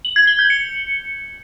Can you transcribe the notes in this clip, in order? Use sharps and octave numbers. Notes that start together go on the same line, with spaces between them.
F#7
G#6
G7
G6
C#7